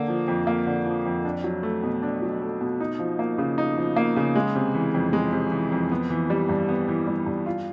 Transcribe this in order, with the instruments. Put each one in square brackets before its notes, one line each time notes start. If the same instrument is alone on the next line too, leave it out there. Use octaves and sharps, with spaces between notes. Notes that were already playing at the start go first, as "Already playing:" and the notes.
Already playing: [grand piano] D3 A#3
F3
F2
A#3
D3
F3
F2
D4
F#3
A3
B2
D4
F#3
A3
B2
D#4
F3
A#3
C#3
D#4
F3
A#3
C#3
G#3
C3
E3
F2
G#3
C3
E3
F2
B3
E3
G3
G2
B3
E3
G3
G2
F4